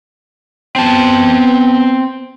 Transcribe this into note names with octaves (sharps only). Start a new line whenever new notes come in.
B3 C4 A5